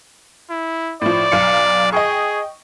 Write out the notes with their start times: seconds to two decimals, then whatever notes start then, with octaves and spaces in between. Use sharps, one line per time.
0.50 E4
1.02 A2 F3 D5
1.32 B1 F5 C#7
1.93 G#4 D#5 G5 C#6